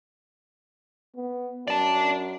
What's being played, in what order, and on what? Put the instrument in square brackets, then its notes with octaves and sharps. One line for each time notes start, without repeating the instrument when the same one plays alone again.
[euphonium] B3
[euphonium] F#2 [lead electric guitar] D5 A5